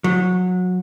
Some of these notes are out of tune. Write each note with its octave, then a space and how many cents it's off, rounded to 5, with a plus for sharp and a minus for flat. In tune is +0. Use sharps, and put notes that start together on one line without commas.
F#3 -25